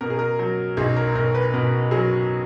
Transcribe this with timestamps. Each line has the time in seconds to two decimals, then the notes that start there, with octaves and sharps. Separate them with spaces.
0.01 B2 A#4
0.10 G#4
0.19 A#4
0.39 F#3
0.77 B1 G#4
0.96 A#4
1.15 B1 A#4
1.35 B4
1.54 B2 A#4
1.91 F#3 G#4